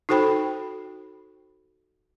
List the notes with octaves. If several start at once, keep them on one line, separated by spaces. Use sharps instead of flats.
D#4 F#4 A4 C5 G5 B5